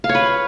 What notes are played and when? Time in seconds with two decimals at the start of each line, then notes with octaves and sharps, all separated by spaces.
0.04 F5
0.09 C#5
0.15 B4